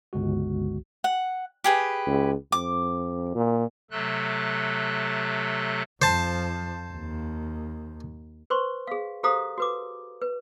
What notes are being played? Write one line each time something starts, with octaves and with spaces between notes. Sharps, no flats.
G1 C#2 G#3 F#4
F#5
G4 G#4 B4
C#2
F2 D6
A#2
C3 F#3 A3 A4 F#6
F2 F3 C5 A5
D#2
B4 C5 C6 C#6
G#4 F5
G4 A4 C5 F5 A#5 D#6
F#4 B4 D6
B4